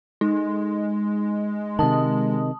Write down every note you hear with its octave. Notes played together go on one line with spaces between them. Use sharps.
G#3 D#4
C3 D#3 A5 D#6